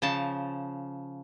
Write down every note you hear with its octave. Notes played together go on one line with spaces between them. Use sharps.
C#3 F3 A5